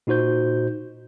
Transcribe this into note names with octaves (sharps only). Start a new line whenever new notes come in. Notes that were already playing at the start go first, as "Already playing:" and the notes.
A#2 D#4 F#4 C5 G6